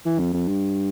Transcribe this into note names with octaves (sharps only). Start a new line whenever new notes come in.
E3
F2
F2
G2